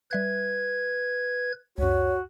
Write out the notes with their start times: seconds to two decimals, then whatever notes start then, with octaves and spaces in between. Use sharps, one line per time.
0.11 G3 B4 E5 F#6 G#6
1.78 C#2 F#2 F#4 C#5